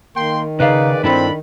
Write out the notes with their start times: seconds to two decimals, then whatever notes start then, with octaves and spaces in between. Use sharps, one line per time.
0.16 D#3 A#3 G5 C6
0.60 C#3 D#4 G#4 B4 D5 F5
1.04 G2 C4 D4 E4 A4 B5